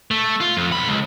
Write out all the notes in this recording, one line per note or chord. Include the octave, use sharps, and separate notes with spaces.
A3
F4
F2
B1 B5
C#2